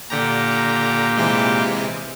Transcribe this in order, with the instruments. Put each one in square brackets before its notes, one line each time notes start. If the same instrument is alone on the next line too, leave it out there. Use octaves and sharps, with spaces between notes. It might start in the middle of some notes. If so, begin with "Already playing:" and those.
[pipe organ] A#2 G4 [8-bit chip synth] D3 A#5
[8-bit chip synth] C3 E3 G#3